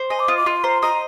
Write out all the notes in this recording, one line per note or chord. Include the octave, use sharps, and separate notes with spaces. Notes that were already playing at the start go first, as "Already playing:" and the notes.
Already playing: C5
D#5 G#5
D6
F4 D#6
D6
F4 C6
C5 A#5
D#5 A#5